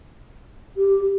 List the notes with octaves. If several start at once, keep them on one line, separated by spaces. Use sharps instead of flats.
G4